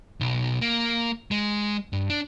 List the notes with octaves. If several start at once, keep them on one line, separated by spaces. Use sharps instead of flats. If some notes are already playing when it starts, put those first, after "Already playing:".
B1
A#3
G#3
G2
D4